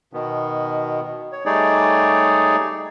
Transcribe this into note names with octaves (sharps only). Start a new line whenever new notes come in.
B2 D#3 B3
C#5
G3 A3 D#4 G#4 C#5 D5